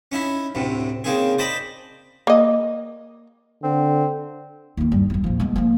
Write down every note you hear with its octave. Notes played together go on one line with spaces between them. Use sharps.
C#4 D#4 E4
D2 A2 C3
C#3 A#3 C4 D#4 G#4
C5 D5 D#5 A5 B5
A#3 D#5
D3 C4
D#2 E3
G2 G3
E2 G3
A#1 F3
G#3 B3
F3 A#3